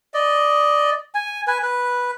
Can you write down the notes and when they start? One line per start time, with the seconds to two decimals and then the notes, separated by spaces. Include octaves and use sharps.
0.14 D5 D#5
1.15 G#5
1.47 B4 G#5
1.63 B4